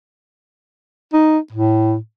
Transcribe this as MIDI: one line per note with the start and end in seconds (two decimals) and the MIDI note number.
1.13 1.38 63
1.52 1.95 45